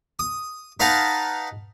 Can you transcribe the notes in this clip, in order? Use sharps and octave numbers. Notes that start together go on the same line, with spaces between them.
D#6
D#4 B4 F5 F#5 A5 A#5